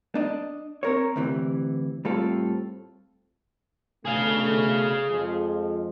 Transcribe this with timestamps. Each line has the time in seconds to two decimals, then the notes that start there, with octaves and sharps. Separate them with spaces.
0.15 D4 D#5
0.83 C4 A#4 C#5
1.16 D2 C3 E3
2.05 A2 G3 C4 F4 A4
4.05 B2 D3 A3 G#4 F5
5.09 F2 F3 G#3